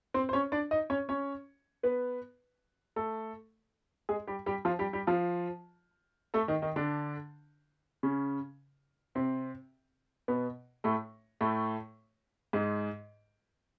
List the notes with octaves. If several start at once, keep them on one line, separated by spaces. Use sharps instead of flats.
C4 C5
C5
C#4 C#5
D4 D5
D#4 D#5
C#4 C#5
C#4 C#5
B3 B4
A3 A4
G#3 G#4
G3 G4
G3 G4
F3 F4
G3 G4
G3 G4
F3 F4
A3 A4
D#3 D#4
D#3 D#4
D3 D4
C#3 C#4
C3 C4
B2 B3
A2 A3
A2 A3
G#2 G#3